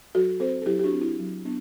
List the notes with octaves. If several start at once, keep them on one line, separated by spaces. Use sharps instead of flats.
F#3 F#4 A4
C4 A4 C5
A4
F#3 E4 G4
G4
D4 F#4
C4
E4
F#3
B3 D4